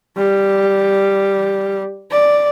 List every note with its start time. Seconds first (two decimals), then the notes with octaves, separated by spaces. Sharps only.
0.17 G3
2.11 D5